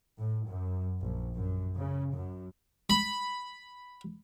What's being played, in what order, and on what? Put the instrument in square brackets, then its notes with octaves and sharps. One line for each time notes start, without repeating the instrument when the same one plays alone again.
[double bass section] A2
F#2
A#1
F#2
C#3
F#2
[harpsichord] B5